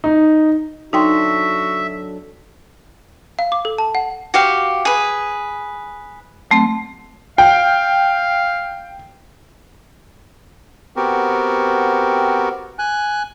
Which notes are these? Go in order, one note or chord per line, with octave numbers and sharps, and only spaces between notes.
D#4
F#3 D4 D#4 F#4 A4 E5 G5 C6
F5
D6
A4
A5
F#5
F#4 G4 F5
G#4 B4
F#3 A3 C4
F5 G5
B3 C4 F#4 G4 A#4
G#5 F#6